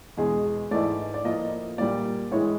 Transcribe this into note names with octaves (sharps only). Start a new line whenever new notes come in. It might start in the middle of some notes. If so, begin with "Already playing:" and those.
E2 B2 G#3 G#4
G#2 E3 A3 D5
D5
A2 F3 A#3 D#5
A#2 G3 A#3 D5
A2 E3 G#3 C#5